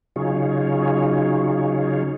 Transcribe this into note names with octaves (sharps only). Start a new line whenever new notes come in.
C#3 F#3 D#4 F4 G#4 C#5